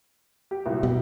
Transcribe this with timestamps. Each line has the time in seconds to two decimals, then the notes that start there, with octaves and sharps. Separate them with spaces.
0.51 G4
0.66 C2 A#2 F#3
0.83 B2 G4